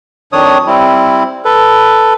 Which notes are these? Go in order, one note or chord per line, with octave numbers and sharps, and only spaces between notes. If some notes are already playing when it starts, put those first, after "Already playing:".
F2 D#3 D4 C#5 D#6
G3 C4 E4
A4 B4